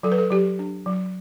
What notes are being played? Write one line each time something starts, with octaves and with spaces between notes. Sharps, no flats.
F#3 A4
B4
A4
F#3 G4
D4
F#3